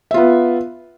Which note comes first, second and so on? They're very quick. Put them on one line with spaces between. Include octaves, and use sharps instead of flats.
E5 F4 B3